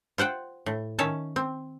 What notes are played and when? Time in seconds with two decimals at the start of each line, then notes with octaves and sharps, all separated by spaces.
0.18 F4 C5 F#5 G5
0.66 A2
0.99 D#3 C#4 C#5 E5 A5
1.36 C4